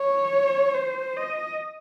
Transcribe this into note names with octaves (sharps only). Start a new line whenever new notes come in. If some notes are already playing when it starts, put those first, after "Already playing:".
Already playing: C#5
C5
D#5